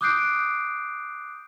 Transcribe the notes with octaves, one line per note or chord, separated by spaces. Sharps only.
D6 D#6 F#6 G6 C7 D7